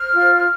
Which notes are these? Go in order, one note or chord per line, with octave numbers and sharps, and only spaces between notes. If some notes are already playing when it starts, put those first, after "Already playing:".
Already playing: C5 F6
F4